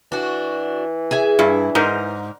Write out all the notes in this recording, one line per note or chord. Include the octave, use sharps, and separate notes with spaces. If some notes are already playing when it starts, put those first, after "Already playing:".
E3 D4 F#4
G#4 E5 G#5
G2 E4
G#2 D#4 A#4 C5